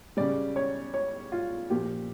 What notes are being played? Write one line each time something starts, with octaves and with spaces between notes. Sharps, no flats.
C#3 G3 D5
C#5
C#5
F4
A#2 F3 G4